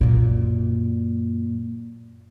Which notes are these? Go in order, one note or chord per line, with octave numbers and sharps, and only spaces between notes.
F#2 A#2